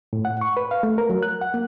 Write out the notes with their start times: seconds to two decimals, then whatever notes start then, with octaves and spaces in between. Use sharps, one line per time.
0.13 A2
0.25 F#5
0.41 C#6
0.57 B4
0.71 F5
0.83 A3
0.98 A#4
1.10 F#3
1.23 F#6
1.41 F#5
1.54 A#3